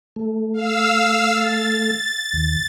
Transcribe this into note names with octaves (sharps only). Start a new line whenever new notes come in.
A3
F5 E6
A6
D#2